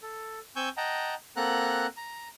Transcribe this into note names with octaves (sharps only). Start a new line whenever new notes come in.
A4
C4 G#5 C#6 E6 G6
D#5 F#5 G5 A5 A#5
A#3 C4 A4 F#5 A#5 F#6
A#5